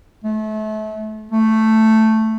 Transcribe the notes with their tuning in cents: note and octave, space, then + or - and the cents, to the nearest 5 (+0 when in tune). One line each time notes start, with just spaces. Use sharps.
A3 -35
A3 +5